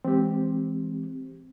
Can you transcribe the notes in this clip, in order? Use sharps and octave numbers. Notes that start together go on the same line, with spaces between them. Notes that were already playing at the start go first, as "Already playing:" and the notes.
E3 G#3 C4 G4